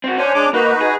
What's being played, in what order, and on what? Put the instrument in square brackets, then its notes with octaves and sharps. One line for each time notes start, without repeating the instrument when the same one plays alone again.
[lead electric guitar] C4 F#4
[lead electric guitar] C#4 [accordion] D4 C5 G#5
[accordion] G#3 D4 D6
[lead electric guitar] A#3 [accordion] D#4 F#4 B4
[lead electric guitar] G#4